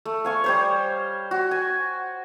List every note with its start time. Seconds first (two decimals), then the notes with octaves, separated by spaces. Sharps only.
0.05 A3
0.25 F5 G#5 C#6
0.44 G3 C5 C#5
1.31 F#4
1.51 G#5